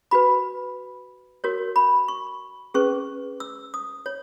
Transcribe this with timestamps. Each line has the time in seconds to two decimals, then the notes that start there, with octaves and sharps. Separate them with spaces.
0.11 F#4 B4 B5
1.44 F#4 A#4 C#5
1.76 B5
2.08 C#6
2.74 C#4 G#4 B4 C#6
3.40 E6
3.74 D#6
4.06 C#5